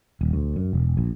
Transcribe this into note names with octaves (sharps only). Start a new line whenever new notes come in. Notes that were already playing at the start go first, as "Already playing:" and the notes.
D#1
D2
F#2
E1
A#1